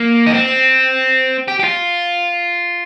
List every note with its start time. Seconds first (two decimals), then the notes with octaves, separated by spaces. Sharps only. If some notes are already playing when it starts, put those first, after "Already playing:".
Already playing: A#3
0.26 D#4
0.34 C4
1.48 G4
1.60 G4
1.64 F4